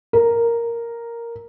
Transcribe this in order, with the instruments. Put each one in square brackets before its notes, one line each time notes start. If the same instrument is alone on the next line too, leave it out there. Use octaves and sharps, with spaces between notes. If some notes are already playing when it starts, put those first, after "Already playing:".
[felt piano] A#4